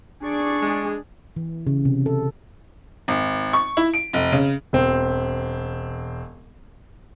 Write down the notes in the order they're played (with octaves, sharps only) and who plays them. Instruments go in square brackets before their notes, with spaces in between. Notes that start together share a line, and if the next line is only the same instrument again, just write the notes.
[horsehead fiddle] D4 G#4 [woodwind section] D5 C#6
[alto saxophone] G#3
[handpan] E3
C#3
C3
A4
[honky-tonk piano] G#1
C#6
E4
D7
F1
C#3
[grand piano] E1 C4